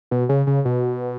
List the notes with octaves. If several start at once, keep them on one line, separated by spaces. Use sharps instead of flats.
B2
C#3
C#3
B2